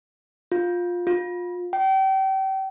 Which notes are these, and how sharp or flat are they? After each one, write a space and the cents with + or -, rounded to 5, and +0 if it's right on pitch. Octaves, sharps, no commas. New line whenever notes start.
F4 +15
F4 +25
G5 -35